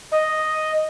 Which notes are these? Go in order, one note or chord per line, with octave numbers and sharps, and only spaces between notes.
D#5